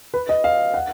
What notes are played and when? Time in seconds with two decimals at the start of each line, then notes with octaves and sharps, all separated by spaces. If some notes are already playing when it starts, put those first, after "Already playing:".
0.14 B4
0.29 D#5
0.44 F5
0.74 F#5